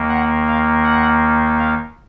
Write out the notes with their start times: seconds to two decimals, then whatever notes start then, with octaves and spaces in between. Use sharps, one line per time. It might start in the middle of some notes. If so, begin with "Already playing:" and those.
Already playing: D#2 D#3 A#3
0.09 F#5
0.47 F5
0.84 F#5
1.59 F5